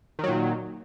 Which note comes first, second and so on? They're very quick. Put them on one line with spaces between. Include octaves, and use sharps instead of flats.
D#3 F#3 A#2